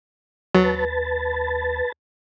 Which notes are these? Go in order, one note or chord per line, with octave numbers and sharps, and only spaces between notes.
D#2 F#3 B4 A5